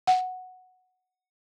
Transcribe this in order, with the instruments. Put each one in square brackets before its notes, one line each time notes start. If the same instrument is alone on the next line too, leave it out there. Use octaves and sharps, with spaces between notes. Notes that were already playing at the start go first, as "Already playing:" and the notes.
[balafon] F#5